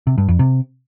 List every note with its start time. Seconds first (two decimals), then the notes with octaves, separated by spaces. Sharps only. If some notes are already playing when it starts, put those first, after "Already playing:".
0.07 C3
0.18 G2
0.28 F2
0.39 C3